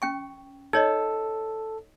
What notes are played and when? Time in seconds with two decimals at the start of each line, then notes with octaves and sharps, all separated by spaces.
0.02 C#4 G5 C#6
0.73 D#4 A4 C#5 D#5